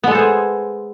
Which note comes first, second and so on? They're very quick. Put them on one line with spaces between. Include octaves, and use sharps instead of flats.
B3 G#3 A4 C5 G#4